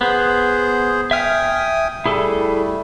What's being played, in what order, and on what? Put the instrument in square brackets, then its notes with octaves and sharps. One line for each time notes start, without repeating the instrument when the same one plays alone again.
[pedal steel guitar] B3 [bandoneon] G#4 C5
[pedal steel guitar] E5 F6 [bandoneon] G5 G#5 D#6
[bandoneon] G3 A3 [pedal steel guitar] E4 G#4 A4